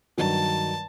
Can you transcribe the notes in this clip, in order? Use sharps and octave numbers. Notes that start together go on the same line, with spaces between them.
G2 D#3 F#3 A5